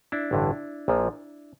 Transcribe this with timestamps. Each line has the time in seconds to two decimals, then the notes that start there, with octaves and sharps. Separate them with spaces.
0.12 D4 E4
0.31 A1 G2 D3
0.88 A#1 A#2 F3